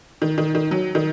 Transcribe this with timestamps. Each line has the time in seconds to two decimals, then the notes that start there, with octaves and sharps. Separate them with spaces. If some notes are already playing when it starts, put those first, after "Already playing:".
0.22 D#3
0.38 D#3
0.55 D#3
0.71 F#3
0.95 D#3